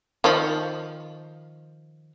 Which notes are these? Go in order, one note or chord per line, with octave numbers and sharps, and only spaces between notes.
D#3 F3